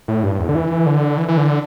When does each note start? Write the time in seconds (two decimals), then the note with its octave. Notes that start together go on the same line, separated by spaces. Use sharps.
0.08 A2
0.23 G2
0.39 E2
0.49 D3
0.55 E3
0.86 D3
1.18 E3
1.28 E3
1.37 D3